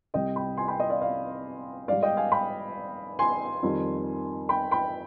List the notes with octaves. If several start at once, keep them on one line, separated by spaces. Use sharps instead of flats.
C2 C3 G3 D#5 G5
G5 B5
G#5 C6
G5 B5
D#5 G5
D5 F5
D5 F5
G#2 G3 D5 F5
D#5 G5
F5 G#5
G5 B5
G#5 C6
F2 D#3 G3
G5 B5
G5 B5